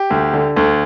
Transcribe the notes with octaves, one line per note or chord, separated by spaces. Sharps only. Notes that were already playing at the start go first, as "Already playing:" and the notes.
Already playing: G4
D2
D3
D2